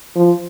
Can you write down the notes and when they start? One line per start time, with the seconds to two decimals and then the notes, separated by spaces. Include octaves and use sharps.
0.16 F3